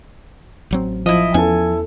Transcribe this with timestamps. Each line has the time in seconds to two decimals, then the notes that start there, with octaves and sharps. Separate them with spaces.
0.71 A1 F#3 C4
1.06 F3 E4 D#5
1.34 E2 B3 C#4 E4 A4 G#5